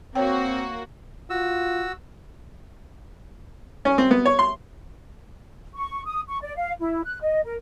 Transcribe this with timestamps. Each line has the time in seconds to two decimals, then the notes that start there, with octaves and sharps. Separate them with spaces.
0.15 A#3 C4 F#4 C#5 G5
1.30 F4 F#4 E6
3.85 C#4
3.98 C4
4.11 B3
4.26 C#5
4.39 C6
5.75 C#6
6.06 D#6
6.29 C#6
6.42 D5
6.56 F5
6.80 E4
7.05 F#6
7.22 D#5
7.44 A#4